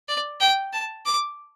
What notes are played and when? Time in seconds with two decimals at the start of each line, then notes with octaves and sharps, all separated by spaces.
0.08 D5
0.40 G5
0.73 A5
1.06 D6